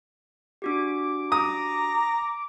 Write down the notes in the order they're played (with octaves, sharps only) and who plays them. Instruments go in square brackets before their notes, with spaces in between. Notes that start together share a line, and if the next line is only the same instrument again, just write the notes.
[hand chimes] D4 F#4 G4 [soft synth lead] D6
[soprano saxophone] A#5 [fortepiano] D#6